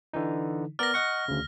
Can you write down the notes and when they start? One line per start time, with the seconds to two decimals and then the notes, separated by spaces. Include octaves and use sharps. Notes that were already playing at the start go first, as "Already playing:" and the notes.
0.13 D3 E3 D#4
0.79 B3 A#4 D5 F6 A#6
0.94 D#5 F#5 C#6
1.28 D2 C#3